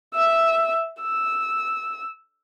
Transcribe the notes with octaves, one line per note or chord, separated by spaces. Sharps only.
E5 E6
E6